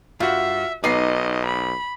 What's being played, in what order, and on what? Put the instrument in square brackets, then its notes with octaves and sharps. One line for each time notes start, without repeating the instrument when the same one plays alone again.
[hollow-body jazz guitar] G2 [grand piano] F4 F#4 [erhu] E5
[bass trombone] B1 [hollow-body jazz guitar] B3 D#4 [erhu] D#5 [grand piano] D6 C7
[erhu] B5